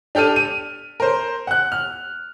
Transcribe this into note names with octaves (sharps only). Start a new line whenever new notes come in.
D4 G4 A4 F6 D#7
D#7
A#4 C5
F#5 F#6
F6